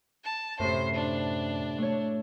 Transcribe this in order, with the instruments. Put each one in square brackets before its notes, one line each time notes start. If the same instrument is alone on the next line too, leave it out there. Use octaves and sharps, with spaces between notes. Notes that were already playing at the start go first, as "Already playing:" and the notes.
[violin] A5
[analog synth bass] F#2 [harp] A2 C3 [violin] C5 C7
[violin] D4
[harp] A3 C#5